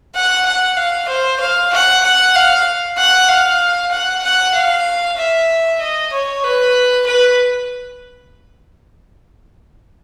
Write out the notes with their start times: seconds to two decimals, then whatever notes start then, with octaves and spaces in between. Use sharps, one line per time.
0.15 F#5
0.46 F#5
0.77 F5
1.08 C5
1.40 F5
1.72 F#5
2.04 F#5
2.35 F5
2.98 F#5
3.29 F5
3.91 F#5
4.23 F#5
4.54 F5
5.18 E5
5.80 D#5
6.13 C#5
6.44 B4
7.06 B4